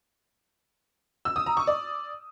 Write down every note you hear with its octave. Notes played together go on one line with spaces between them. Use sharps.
E6
D#6
A#5
C#6
D5